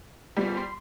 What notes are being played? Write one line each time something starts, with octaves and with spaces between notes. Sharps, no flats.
G3 B3 F4 C5
C6